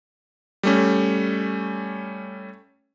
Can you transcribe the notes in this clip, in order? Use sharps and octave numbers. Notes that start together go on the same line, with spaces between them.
G3 A3 C#4